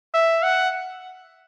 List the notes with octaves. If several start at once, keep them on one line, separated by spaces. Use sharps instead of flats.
E5
F#5